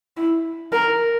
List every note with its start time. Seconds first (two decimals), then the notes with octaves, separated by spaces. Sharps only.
0.17 E4
0.72 A#4